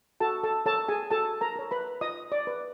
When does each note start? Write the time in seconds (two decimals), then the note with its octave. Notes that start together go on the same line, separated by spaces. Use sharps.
0.20 F#4 A4 A5
0.43 A4 A5
0.66 A4 A#4 C#5 A5
0.88 G#4 G#5
1.11 F#4 A4 A5
1.41 A#4 A#5
1.56 A#4 C#5
1.71 B4 B5
2.01 F4 D#5 D#6
2.32 D5 D6
2.47 G#4 B4